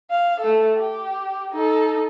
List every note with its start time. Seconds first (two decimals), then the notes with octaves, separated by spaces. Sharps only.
0.11 F5
0.40 A3 A4
0.76 G4
1.52 D#4 A4